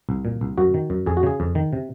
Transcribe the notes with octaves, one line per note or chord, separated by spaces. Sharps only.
C2
A#2
C2
F#2 F#4
D#3
F#2
F2 G#4
F#4
C#3 G#4
F2
D#3
C3